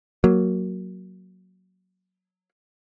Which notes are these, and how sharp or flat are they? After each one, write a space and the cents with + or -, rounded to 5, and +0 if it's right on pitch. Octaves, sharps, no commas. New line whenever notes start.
F#3 +0 A#3 +0